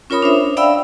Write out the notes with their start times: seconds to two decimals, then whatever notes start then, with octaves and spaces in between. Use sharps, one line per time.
0.10 C#4 F4 A#4 C#5 B5 D#6
0.22 D4 C5 E5
0.57 D5 E5 F5 G5 B5 E6